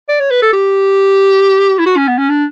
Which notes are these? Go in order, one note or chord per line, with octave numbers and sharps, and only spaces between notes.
D5
C#5
B4
A4
G4
E4
F#4
C#4
B3
C#4
D4